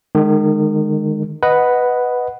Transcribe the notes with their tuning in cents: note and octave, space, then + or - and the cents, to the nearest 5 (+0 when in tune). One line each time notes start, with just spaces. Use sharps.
D#3 -30 G#3 +0
B4 +0 D#5 +0 F#5 +0